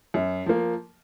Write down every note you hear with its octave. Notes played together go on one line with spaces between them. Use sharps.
F#2
F3 A#3